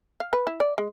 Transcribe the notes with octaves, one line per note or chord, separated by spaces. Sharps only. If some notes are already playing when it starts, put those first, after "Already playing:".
F5
B4
E4
D5
G#3